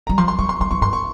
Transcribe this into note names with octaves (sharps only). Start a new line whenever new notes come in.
G3 A#5
F3 C6
C6
G3 C#6
C6
G3 C6
F3 C#6
G2 C6
C#6